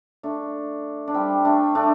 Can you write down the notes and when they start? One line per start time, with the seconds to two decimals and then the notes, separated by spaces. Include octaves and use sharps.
0.23 A3 D4
1.08 D4
1.14 G3 C4
1.45 A3 D4
1.75 A3 D4